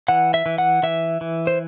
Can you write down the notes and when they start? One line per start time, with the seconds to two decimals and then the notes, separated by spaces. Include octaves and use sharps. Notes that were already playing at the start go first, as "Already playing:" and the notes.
0.08 E3 F#5
0.34 E5
0.46 E3
0.58 F#5
0.83 E3 E5
1.21 E3
1.47 C5